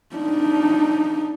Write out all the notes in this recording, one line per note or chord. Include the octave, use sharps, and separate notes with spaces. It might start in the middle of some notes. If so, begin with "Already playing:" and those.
D4 D#4